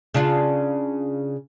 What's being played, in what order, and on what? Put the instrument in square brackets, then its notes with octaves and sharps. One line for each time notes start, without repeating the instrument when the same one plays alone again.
[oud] C#3 D4 F4